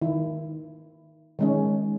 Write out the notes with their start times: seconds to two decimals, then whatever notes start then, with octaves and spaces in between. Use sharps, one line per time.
0.02 D#3 E4
1.39 D#3 G#3 C#4